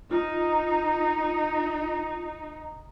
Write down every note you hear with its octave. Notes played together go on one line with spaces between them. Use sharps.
D#4 F4